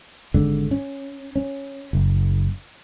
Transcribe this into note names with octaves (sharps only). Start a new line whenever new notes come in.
G#1 G#2 D3 G#3
C#4
C#4
F#1